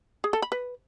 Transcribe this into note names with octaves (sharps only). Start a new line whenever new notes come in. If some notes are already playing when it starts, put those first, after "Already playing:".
G#4
A4
B5
B4